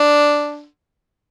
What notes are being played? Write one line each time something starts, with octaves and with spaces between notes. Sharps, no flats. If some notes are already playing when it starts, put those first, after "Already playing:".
Already playing: D4